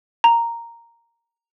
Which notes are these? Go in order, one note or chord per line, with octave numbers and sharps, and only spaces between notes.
A#5